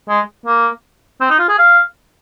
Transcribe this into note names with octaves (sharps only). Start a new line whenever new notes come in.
G#3
A#3
C4
D#4
F4
G#4
F5